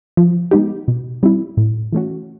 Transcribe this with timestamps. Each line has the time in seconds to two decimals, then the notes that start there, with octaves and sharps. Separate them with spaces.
0.17 F3
0.51 G#3 B3 D#4 G4
0.88 B2
1.23 G3 C4 E4
1.57 A2
1.92 E3 A3 C#4 F#4